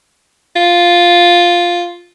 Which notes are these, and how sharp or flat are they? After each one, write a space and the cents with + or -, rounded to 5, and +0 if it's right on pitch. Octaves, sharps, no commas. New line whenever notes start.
F4 +0